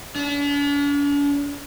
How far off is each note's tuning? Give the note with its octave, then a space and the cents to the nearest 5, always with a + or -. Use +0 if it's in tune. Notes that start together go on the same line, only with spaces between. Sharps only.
D4 -45